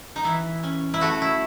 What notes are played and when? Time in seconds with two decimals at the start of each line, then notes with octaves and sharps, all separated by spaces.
0.16 D#4
0.24 E3 E4
0.63 C#4
0.94 E4
1.01 A3 F#4
1.22 E4